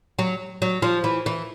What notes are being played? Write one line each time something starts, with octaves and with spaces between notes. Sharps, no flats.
F#3
F#3
F3
E3
E3